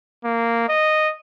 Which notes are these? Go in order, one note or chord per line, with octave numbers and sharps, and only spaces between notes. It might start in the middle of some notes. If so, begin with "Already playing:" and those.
A#3
D#5